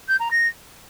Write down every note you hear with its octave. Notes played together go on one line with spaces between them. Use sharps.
G6
A#5
A#6